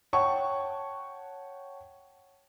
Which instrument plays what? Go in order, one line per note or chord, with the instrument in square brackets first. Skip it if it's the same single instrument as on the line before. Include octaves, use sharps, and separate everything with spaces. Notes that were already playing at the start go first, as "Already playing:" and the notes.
[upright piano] C#5 F#5 G5 A5 C#6